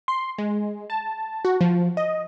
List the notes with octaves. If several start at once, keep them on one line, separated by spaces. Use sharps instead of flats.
C6
G#3
A5
F#4
F3
D#5